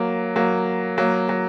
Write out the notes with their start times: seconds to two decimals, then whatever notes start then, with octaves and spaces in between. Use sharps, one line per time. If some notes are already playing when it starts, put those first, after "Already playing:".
Already playing: F#3 A#3
0.36 F#3 A#3
0.98 F#3 A#3
1.29 F#3